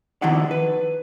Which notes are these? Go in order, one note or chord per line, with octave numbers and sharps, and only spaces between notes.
D#3 F3 E4 F#4 D5 F#5
B4